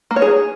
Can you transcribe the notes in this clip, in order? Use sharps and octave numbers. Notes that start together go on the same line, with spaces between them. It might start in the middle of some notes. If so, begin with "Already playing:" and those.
A#3
C#5
G#4